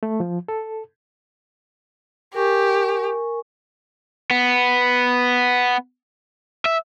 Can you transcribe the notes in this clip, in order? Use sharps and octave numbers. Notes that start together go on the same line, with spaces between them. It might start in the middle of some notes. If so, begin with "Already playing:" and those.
A3
F3
A4
G4 A#4 G#5 C#6
B3
E5